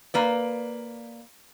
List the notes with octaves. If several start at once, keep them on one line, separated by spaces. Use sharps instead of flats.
A#3 B4 D5